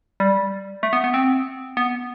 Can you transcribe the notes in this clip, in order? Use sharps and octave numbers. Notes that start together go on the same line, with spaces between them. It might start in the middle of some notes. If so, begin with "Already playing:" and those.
G3
A3
B3
B3
C4
B3